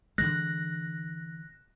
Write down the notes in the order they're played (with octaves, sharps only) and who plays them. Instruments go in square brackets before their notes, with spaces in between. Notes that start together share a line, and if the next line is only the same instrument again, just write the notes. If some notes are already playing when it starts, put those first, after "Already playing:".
[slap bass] D3 E3 G#3 [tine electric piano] F#6 A#6